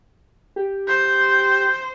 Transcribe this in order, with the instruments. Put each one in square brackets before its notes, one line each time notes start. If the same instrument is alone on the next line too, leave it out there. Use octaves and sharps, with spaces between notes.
[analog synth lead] G4
[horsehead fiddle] C5 [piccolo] G6